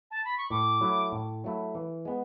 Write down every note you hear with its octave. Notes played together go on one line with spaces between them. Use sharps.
A5
B5
C#6
A2 D6
F#3 A3 E4
A2
F#3 A3 E4
E3
G#3 B3